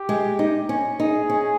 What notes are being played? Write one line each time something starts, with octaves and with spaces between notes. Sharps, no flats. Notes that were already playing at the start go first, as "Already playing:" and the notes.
Already playing: G4
G#3
D#4
C#4
D#4 G#4
C#4